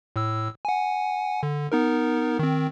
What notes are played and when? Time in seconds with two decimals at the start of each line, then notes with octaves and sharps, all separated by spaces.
0.16 A2 E6
0.65 F#5 G#5
1.43 D3
1.72 B3 D#4 A#4
2.39 D#3 C4